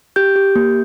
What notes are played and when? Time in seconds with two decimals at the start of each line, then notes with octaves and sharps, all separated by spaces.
0.16 G4 G6
0.36 G4
0.56 A#3